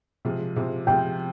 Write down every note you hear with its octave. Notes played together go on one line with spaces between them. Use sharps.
C3 F3 G#3
C3 F3 G#3
C3 F3 G#3 G5